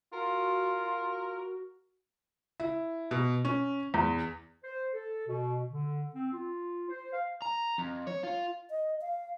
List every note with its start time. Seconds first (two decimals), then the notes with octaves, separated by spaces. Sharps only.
0.13 F4 F#4 A#4
2.60 E4
3.11 B2
3.45 C#4
3.94 E2
4.63 C5
4.94 A4
5.27 B2
5.70 D3
6.15 C4
6.33 F4
6.89 C5
7.13 F5
7.42 A#5
7.78 F2
8.07 C#5
8.24 F4
8.70 D#5
9.01 F5